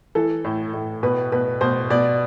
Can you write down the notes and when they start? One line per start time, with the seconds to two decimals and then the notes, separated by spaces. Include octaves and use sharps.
0.15 E3 A4
0.44 A2
0.73 A2
1.03 B2 B4
1.32 B2 B4
1.61 B2 C5
1.90 B2 D5